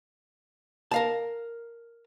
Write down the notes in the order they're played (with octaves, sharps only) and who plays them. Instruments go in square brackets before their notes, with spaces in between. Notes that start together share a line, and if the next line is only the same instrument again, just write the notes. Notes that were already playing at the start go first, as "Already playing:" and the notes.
[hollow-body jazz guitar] A#4 F5 A5